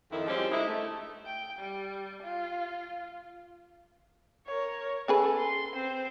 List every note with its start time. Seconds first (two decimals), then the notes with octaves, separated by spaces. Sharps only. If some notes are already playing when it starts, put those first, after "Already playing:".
0.11 F2 D#3 E4
0.27 F3 G3 G#3 C4 C#4 G4
0.51 D3 G#3 D#4 E4
0.68 A3
1.26 G5
1.59 G3
2.23 F4
4.47 A#4 C#5
5.08 C#4 G#4 A4 B4
5.38 C6
5.74 C4 C5